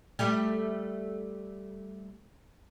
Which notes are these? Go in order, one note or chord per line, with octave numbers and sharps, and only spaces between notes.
G3 A3 G4